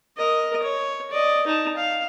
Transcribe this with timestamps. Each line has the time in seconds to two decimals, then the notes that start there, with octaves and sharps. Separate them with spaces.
0.17 A#4 D#5
0.63 C#5
1.11 D5 D#5
1.47 D#4 A5
1.77 F5